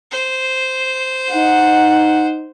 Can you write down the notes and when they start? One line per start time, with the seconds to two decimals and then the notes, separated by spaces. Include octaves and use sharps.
0.11 C5
1.34 D#4 F#5